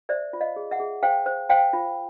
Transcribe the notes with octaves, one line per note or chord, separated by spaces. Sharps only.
C5 D5 E5
F4
D#5 F5
G#4
E5 F#5
G#4
C5 F5 G5
C5
C5 F5 G5
F4